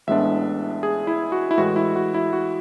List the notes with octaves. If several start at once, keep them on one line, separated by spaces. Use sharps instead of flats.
A1 A2 G#3 B3 D4 E5
G#4
E4
F#4
E4
A2 E3 G#3 F#4
E4
F#4
E4
F#4